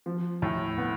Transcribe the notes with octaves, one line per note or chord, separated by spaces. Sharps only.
F3
A2
B3